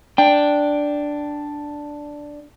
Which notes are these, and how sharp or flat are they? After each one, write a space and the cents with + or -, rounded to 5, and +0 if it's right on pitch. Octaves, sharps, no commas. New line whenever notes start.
D4 +0 G5 +0